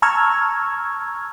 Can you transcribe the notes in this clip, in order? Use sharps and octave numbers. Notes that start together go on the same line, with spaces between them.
A5 A#5 C#6 E6 F6 G#6